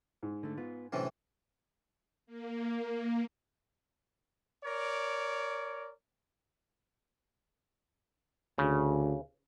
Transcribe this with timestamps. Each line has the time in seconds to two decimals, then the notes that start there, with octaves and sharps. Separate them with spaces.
0.23 G#2
0.43 D3 A3
0.58 B3 F4
0.93 A2 C3 E3 F#3 C#4 D4
2.26 A#3
4.64 A#4 C#5 D5
8.58 D2 C#3